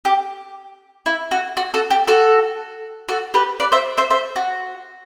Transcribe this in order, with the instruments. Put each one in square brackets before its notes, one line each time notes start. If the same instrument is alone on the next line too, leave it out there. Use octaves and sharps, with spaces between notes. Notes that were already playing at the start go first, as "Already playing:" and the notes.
[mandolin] G4
E4
F#4
F#4
F#4 A4
G4
F#4 A4
F#4 A4
G4 B4
B4 D5
C5 E5
C5 E5
C5 E5
F#4